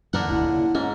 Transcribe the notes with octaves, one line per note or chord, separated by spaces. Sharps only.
F#2 A#2 D3 E3 A#4 F#5
F1 D2 E4
A#2 C#3
G#2 A#3 C#4